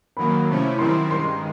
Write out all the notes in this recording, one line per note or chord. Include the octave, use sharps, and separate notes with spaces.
F#2 D#3 F#3 A#3 B5
C3 F3 A3 C#4 E4
F#2 D#3 G3 C4 E4 C6
G2 D#3 G#3 C6